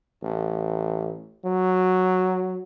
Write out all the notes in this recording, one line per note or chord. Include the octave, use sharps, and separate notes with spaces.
A1
F#3